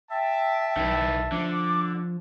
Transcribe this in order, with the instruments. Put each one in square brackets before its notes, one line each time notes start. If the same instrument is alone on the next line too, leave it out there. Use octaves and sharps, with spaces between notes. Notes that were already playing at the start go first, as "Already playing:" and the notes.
[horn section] E5 A5 [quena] G5
[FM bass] B1 [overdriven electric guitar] D#3 E4
[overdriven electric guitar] D3 [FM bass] F3 [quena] D6